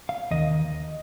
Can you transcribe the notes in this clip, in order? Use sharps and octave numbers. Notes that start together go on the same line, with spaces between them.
F5
D#2 D#3 D#5